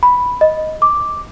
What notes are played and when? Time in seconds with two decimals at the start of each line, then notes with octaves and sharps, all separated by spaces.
0.03 B5
0.41 D#5
0.82 D6